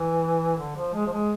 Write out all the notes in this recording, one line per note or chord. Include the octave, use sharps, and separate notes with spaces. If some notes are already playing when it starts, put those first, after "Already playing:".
Already playing: E3
D3
F3
G#3
F3
G#3